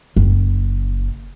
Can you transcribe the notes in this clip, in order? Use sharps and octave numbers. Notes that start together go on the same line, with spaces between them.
F#1